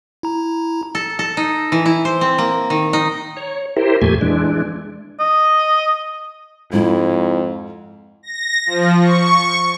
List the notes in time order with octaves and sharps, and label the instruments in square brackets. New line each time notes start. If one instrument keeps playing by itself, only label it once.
[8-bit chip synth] E4 A#5
[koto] A4
A4
D#4
E3
E4
C5
C4
A#3
D#3
D#4
[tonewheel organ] C#5
E4 G4 A#4 C5
F2 A#2 A3 G4 G#5
E3 G#3 D4
[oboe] D#5
[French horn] F2 [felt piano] G#2 [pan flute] E4
[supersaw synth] A#6
F3
C#6